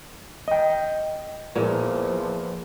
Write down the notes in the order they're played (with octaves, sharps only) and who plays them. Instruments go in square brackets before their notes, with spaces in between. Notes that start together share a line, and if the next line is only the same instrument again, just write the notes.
[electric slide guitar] D#5 G5
[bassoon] E2 [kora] A#2 [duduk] F3